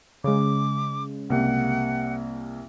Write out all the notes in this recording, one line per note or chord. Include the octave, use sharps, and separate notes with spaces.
C#3 G#3 D6
C2 G3 A#3 F#5